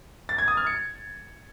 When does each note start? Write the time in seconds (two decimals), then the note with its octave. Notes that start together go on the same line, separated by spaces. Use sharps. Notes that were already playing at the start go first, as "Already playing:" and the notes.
0.29 A6
0.38 G#6
0.48 D#6
0.57 F6
0.67 C#7